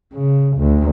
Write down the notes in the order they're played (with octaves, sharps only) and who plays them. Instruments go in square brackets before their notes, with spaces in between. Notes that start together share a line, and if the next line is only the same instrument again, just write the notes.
[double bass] C#3
D2